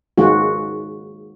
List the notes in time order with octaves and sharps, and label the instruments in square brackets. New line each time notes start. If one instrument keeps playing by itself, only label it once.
[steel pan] D#3 G#3 F4 F#4